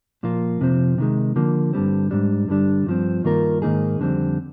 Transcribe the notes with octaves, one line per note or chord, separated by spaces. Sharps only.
A#2 F3 A#3 F4
F2 C3 F3 C4
C3 D#3 G#3
D3 F3 A#3
G2 D3 G3 C4
G#2 G3 D4
G2 D3 G3 D4
G2 F3 C4
G2 D#3 A#3 F4 A#4
G#2 D#3 A#3 D#4 G#4
F2 D3 G3 C4